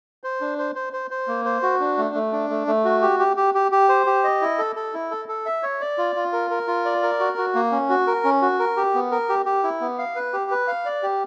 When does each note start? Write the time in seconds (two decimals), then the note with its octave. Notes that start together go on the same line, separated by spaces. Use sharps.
0.24 C5
0.41 D4
0.58 C5
0.75 C5
0.93 C5
1.11 C5
1.27 A#3
1.45 C5
1.62 F#4
1.80 D4
1.97 A3
2.15 A3
2.32 D4
2.50 A3
2.67 A3
2.84 F#4
3.02 G4
3.19 G4
3.37 G4
3.54 G4
3.72 G4
3.89 C5
4.06 G4
4.24 D#5
4.41 E4
4.58 A4
4.76 A4
4.94 E4
5.11 A4
5.28 A4
5.46 E5
5.63 C#5
5.81 D5
5.98 F4
6.16 F4
6.33 A#4
6.50 A#4
6.67 F4
6.85 D5
7.02 A#4
7.20 F#4
7.38 F#4
7.55 A#3
7.72 C#4
7.90 F#4
8.07 A#4
8.24 C#4
8.42 F#4
8.59 A#4
8.77 G4
8.94 B3
9.11 A#4
9.29 G4
9.46 G4
9.64 E4
9.81 B3
9.98 F5
10.16 B4
10.33 G4
10.51 B4
10.68 F5
10.85 D5
11.03 G4